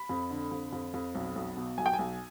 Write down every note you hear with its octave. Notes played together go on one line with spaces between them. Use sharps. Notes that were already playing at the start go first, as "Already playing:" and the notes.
Already playing: B5
F2
D3
F2
F2
F2
B1
B1
B2
B1 G#5
G5
G#5
B1